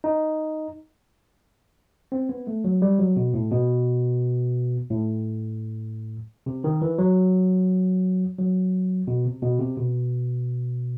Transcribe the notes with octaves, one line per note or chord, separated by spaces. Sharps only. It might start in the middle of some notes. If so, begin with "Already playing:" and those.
D#4
C4
B3
A3
F#3
G3
F#3
B2
A2
B2
A2
C3
D#3
E3
F#3
F#3
B2
C3
B2
C3
B2